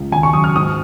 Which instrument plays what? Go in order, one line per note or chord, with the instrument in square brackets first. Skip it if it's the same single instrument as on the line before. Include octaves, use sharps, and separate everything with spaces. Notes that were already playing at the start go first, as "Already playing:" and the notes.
Already playing: [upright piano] C#2
D#2 G#5
C#6
F#3 D#6
F6
G#2 D#6